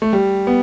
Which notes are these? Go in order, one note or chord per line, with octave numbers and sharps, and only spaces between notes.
A3
G3
B3